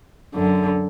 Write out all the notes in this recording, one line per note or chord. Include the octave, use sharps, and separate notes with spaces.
F#2 D3